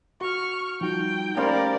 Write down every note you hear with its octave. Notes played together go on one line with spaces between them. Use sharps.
F#4 C#6 F6
F3 G3 D#4 F#4 G5
G3 A3 A#3 C#4 A#4 C5 D5 F5